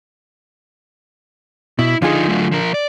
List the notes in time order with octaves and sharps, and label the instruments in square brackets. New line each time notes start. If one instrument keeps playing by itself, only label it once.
[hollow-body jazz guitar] B2 [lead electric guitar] E4
[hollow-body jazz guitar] D3 F4 G#4 [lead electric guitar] F3 D#4
[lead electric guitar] F#3 A3
F3 A#4
D5